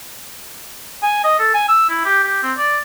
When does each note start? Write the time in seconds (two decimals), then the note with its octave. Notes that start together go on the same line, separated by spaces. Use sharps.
1.03 G#5
1.24 D#5
1.39 A4
1.54 G#5
1.69 E6
1.90 E4
2.06 G4
2.24 G4
2.43 C4
2.58 D5